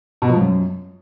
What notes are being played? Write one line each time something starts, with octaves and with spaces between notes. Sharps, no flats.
B2
F3
F#2